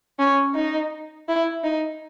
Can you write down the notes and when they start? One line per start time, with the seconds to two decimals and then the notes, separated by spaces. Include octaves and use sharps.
0.19 C#4
0.55 D#4
1.28 E4
1.64 D#4